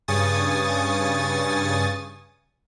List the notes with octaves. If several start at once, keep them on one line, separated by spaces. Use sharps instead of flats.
G2 C#3 G#5 C#6 D#6 A6